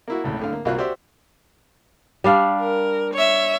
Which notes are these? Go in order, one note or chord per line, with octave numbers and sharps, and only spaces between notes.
A#3 E4 F#4
G#1 C#2 A2
A2 D3 F5
A#3
C2 A#3 F4 F#4 F#6
F#4 G4 C5 D5 E5
G3 D4 F5
A#4
C#5 E5